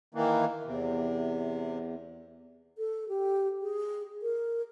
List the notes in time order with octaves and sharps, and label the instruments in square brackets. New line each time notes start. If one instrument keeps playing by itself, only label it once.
[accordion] D#3 E3 A#3
[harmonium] E2 [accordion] C3
[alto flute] A4
G4
G#4
A#4